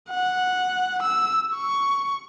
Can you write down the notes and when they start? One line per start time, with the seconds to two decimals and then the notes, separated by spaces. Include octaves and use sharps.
0.10 F#5
1.02 E6
1.55 C#6